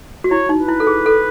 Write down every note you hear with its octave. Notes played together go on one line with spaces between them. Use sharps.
F#4
E4 C#5
D#4
B4
E4
A4
G#4
A4